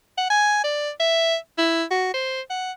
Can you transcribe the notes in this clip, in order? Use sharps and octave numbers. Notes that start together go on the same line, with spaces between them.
F#5
G#5
D5
E5
E4
F#4
C5
F#5